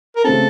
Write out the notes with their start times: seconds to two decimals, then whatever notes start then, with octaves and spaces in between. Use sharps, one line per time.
0.16 A#4
0.24 C#3 A3 C4 A4